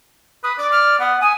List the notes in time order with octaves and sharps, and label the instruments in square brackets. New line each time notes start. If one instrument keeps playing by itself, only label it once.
[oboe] B4 [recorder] D#6
[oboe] D5 [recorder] D6
[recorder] F6
[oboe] B3 [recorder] F#5
[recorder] G#5 [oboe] D#6